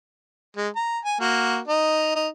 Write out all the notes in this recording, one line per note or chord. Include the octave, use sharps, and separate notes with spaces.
G#3
A#5
G#5
A#3 F#4
D#4
D#4